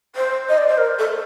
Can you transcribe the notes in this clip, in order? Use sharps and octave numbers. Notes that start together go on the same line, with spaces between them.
C5
D#5
D5
C5
A#4
A4